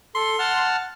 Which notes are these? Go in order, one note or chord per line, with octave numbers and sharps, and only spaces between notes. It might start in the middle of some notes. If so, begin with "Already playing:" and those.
A4 C6
F#5 A5 F6